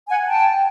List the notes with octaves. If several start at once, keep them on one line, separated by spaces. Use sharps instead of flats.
F#5 G#5
G5 A5